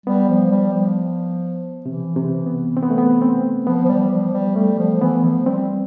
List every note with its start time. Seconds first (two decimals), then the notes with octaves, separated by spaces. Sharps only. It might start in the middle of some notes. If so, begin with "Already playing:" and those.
0.06 G3 B3
0.29 F3
0.51 G3
0.74 F3
1.86 C3 E3
2.16 C3
2.46 B3
2.77 C4
2.83 B3
2.91 A3
2.98 B3
3.21 C4
3.66 F3 B3
3.85 F3
3.89 G3
4.11 F3
4.34 G3
4.56 G3 A3
4.79 F3
5.01 E3 B3
5.24 F3
5.46 G3 C4